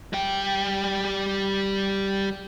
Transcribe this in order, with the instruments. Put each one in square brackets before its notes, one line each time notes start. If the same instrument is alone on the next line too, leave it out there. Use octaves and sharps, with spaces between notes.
[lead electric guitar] G3 G5